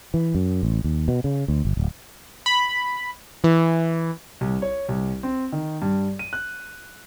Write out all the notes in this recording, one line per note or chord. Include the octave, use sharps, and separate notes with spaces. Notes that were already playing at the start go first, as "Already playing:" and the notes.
E3
F#2
A1
D#2
B2
C#3
D2
G1
D1
B5
E3
C2
C#5
C2
C4
D#3
G2
D#7
F#6